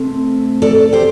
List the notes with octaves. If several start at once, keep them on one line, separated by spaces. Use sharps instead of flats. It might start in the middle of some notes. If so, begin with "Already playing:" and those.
Already playing: C3 A3 C4
A4 D5
G4 C5